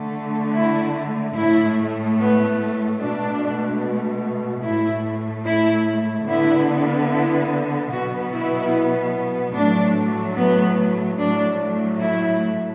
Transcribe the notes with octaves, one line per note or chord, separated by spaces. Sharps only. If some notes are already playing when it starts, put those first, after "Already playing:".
Already playing: D3 A3
E4
A2 A3 E4
B3
B2 A3 D4
A2 A3 E4
E4
D3 B3 E4
E4
B2 F#3 B3 F#4
E4
A2 F#3 A3 D4
B3
A2 F#3 A3 D4
E4